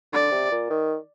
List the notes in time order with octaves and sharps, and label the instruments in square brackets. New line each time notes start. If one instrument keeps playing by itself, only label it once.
[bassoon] D3 [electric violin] D5
[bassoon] C3
A#2
D#3